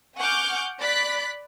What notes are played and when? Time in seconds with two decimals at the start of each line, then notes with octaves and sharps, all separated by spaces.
0.16 F#5 G#5 C#6 D6 F6 G6
0.80 D5 B5 F#6 B6